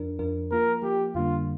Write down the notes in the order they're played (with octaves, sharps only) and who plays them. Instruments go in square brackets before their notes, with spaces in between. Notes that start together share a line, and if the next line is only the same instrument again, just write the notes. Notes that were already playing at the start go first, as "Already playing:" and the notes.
Already playing: [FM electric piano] F2 F3 D4 A#4
F2 F3 D4 A#4
[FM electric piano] F3 A#3 F4 [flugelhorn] A#4
[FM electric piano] F3 A#3 F4 [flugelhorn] G4
[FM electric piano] F2 D3 G3 A#3 D4 [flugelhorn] F4